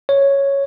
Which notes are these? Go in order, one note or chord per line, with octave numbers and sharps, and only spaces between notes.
C#5